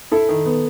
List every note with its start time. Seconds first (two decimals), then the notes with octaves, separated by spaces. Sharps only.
0.12 E4 A4
0.29 D#3
0.45 B3